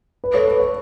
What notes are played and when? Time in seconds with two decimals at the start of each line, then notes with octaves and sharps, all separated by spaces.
0.24 B4
0.34 A4 C#5
0.48 B4
0.60 C#5